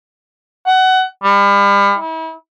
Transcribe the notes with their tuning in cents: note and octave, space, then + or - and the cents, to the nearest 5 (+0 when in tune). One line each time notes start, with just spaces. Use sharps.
F#5 +20
G3 +40
E4 -40